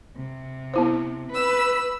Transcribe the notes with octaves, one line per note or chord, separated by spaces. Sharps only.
C3
B3 E4 C5
B4 E6